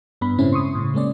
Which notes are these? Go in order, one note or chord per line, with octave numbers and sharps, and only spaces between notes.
G2 B3 D4 B5
A2 C#3 G#3 C4 C#4 E4
C6 C#6 D#6
A2 C#3
G#3 A#3 C#4 D5